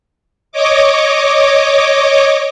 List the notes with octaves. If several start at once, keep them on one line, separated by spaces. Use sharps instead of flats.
C#5 D#5 D6